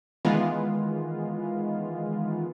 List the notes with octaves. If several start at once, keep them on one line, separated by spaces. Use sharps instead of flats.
D#3 E3 G#3 B3 F4